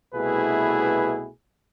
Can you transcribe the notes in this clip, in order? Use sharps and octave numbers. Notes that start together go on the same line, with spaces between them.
C2 B2 A3 E4 G#4 B4